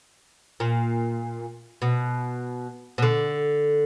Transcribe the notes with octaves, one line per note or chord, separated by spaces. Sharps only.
A#2
B2
B2
D3